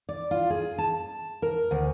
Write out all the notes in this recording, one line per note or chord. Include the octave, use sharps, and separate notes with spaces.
D5
F4
G#4
A5
A#4
D2